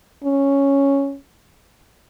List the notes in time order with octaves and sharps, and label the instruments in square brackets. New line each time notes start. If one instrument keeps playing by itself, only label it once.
[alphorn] C#4